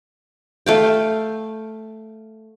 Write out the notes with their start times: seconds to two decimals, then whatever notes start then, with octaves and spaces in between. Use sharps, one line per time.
0.66 A3 F5 G5